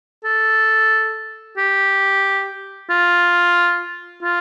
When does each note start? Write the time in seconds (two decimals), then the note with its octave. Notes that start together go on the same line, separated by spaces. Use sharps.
0.24 A4
1.57 G4
2.90 F4
4.23 F4